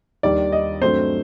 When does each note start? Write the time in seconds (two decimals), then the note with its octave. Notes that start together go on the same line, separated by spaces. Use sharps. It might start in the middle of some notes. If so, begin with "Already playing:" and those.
0.23 D#2 D#3 G3 D4 D5
0.52 D#5
0.81 G2 F#3 A3 C4 C5